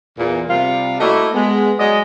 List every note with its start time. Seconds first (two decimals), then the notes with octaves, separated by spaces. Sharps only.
0.17 E2 A#2
0.49 C3 G3 F4
1.00 A3 A#3 E4 F#4 D5 D#5
1.33 G#3 B3
1.79 F#3 G#3 G#4 D5 D#5